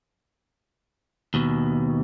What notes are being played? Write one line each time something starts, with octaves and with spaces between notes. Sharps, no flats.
D#2 B2